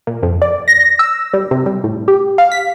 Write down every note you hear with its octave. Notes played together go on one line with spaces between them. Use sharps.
A#2
F2
D5
A#6
E6
G3
C3
G3
A2
G4
F5
B6